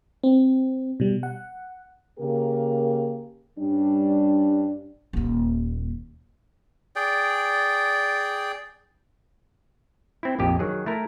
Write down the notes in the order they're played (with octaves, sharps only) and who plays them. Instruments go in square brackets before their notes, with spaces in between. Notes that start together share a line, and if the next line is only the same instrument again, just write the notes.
[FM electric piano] C4
B2 G3
F#5
[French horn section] C#3 A#3 G4 A#4
G2 G3 C#4 D4
[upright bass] D#1 D#2
[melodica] G#4 D5 G5
[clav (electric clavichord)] C4 E4
A#1 F2 G4 D#5
D#3 F#3 G#4
A3 E4 A#4